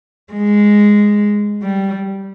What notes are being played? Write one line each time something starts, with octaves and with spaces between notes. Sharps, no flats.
G#3
G3